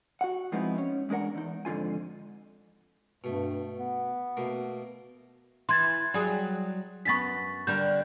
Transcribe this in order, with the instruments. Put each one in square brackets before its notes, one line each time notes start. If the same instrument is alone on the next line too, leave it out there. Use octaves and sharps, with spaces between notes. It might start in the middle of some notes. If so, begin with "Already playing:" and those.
[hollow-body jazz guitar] F#4 F#5
F3 G#3 B3 C4 D#4 E4
C#4
E2 G#3 D4 A#4 F#5
E2 D#4
F2 G#2 D3 F4 G#5
[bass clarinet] G2 [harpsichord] B2 A3
[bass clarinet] B3
[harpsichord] B2 A3 A#3
[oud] E3 [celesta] C6 G#6 A6
[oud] F#3 G3 G#4
[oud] F#2 B3 [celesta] C#6 A6 B6
[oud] D3 G3 A#4 [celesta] G6